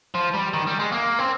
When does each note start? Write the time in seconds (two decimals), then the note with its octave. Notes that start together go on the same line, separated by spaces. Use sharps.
0.15 F3
0.34 G3
0.54 D#3
0.67 G3
0.79 G#3
0.92 A#3
1.19 C4